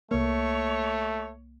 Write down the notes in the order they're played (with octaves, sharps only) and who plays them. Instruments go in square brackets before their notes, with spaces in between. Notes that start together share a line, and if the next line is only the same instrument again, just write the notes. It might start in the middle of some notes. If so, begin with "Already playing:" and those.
[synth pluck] C2 A#3 [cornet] A3 [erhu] C#5